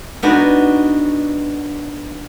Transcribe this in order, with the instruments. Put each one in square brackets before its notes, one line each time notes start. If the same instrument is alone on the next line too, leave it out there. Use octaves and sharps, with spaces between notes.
[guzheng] B3 D4 D#4 F#4